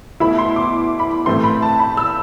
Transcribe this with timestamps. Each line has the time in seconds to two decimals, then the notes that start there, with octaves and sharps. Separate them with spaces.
0.20 B2 A3 E4 B5
0.38 C6
0.56 D6
0.99 B5
1.26 A2 E3 A3 C4 C6
1.44 B5
1.62 A5
1.79 B5
1.97 E6